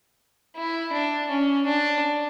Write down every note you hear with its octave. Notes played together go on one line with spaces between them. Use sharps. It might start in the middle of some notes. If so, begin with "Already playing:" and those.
E4
D4
C#4
D4